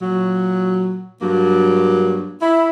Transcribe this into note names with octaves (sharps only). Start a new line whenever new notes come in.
A#2 F#3
G2 F#3 A#3
E4